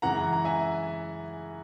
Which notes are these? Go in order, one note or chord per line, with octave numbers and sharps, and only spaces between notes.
F#2 C#3 E3 G#3 F#5 A#5
A#5
E5 G#5